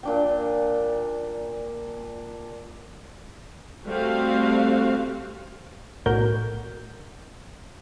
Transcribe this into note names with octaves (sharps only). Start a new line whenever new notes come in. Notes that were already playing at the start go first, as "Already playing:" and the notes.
A#2 D4 G5
G3 A3 C4 F#4 F5
B1 A2 F#4 A#4 G6